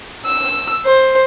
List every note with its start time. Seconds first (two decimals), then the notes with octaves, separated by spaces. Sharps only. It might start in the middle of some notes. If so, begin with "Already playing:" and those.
0.24 E6
0.85 C5